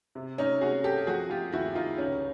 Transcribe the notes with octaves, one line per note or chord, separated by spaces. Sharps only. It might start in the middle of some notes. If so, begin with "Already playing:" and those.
C3
C#4 D#4
C3 F#4 G#4
G4 A4
F3 F#4 G#4
F4 G4
D#2 E4 F#4
D#4 F4
C#2 C#4 D#4